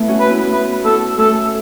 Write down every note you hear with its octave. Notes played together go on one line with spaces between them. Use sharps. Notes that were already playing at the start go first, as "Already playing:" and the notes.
Already playing: A3 B3 E4
C#4 F#4
B4
B3 E4
B3 E4 B4
B3 E4 A4
A3 C#4 A4